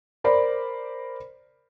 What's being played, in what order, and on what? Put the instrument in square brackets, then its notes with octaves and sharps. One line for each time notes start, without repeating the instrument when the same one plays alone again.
[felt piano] A#4 C5 D5 B5